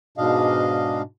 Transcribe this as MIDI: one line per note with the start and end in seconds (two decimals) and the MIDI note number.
0.18 1.02 44
0.18 1.02 47
0.18 1.02 62
0.18 1.02 75
0.18 1.02 77